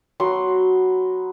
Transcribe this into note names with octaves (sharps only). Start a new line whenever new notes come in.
F#3 B3 F#5 C6